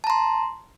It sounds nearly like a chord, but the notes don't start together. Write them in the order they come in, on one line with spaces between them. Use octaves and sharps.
A5 A#5 C6